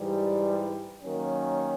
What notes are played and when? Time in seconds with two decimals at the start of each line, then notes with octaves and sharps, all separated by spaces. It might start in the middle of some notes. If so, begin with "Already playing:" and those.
Already playing: G#2 E3 G3
1.03 D#3 F#3 A#3 C#4